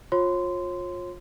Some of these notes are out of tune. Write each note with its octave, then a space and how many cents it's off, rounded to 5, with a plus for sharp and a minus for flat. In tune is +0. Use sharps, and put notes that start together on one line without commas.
F4 +25 C#5 -40 C6 -20